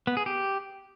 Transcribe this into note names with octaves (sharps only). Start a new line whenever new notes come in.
B3
G#4
G4